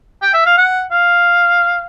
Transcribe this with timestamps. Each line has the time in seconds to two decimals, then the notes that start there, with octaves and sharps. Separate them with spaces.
0.22 G5
0.34 E5
0.46 F5
0.57 F#5
0.91 F5